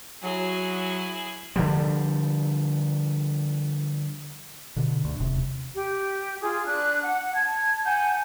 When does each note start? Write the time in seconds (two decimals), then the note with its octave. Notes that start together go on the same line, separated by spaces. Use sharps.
0.23 F#3 E4 G#4
1.56 D3 F3 G3
4.76 B2 D3
5.05 D2
5.20 D#1 C3
5.74 G4
6.42 F4 G#4
6.66 D4 F#6
7.04 F#5
7.35 A5 G#6
7.85 F#5 G#5 A5 G6